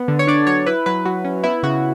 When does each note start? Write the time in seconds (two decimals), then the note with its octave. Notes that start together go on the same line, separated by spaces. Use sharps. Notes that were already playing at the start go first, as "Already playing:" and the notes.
Already playing: B3
0.08 D3
0.19 C#5
0.27 D4 D5
0.47 F#3 C#5
0.66 E4 B4
0.86 F#3 B4
1.05 F#3 F#4
1.25 C#4
1.44 B3 E4
1.63 C#3 F#4